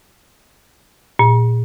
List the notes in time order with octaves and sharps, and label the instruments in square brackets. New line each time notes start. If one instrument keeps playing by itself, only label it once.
[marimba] A#2